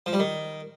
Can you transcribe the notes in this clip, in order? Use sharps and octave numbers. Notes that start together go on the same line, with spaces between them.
F3
G3
D#3